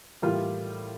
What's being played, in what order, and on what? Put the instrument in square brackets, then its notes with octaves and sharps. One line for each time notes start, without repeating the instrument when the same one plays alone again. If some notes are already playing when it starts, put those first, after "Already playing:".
[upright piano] A2 E3 G3 A#3 F4 G4